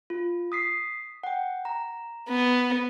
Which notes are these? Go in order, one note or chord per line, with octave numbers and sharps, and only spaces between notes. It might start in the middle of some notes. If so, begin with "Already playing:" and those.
F4
D#6 B6 C7
F#5 G5
A#5
B3